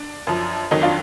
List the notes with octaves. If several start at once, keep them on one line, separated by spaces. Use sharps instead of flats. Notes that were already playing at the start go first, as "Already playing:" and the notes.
Already playing: D4
F#2 F3
F2 D#3 F#3 D#4
D4 F4